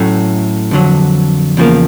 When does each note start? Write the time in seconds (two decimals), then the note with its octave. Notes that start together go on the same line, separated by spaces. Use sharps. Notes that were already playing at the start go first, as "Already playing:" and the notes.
Already playing: A2 F#3 A3 C#4
0.71 F2 D3 F#3
1.57 E2 C#3 F3 A#3